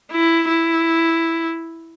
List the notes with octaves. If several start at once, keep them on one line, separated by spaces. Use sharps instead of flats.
E4
E4